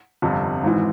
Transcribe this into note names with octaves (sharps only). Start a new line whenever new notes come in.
G1 F2 C3
G#1 G#2 E3